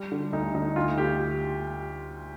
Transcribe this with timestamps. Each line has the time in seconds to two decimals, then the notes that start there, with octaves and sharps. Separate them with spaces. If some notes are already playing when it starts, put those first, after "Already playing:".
Already playing: G3
0.12 D3
0.32 D2 D#4
0.55 D3 D#4
0.76 D2 F4
0.98 D2 G4